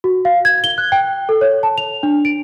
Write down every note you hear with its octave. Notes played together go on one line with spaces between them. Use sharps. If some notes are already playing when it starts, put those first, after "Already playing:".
F#4
F5
G#6
G7
F#6
G5
A4
C#5
A5
F7
D4
D7